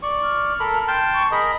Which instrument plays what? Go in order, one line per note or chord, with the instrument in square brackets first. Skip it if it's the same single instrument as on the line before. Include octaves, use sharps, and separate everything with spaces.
[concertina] D5 C#6
[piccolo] F6
[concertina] A4 A#4 B5
G5 A5 C6
[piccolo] C#6
[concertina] G#4 A#4 D#5 [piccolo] B5